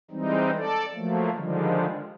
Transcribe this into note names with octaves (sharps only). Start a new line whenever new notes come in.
E3 G3 G#3 C4 D#4
A4 D5
F3 F#3 A3 A#3
D3 D#3 F3 G3 G#3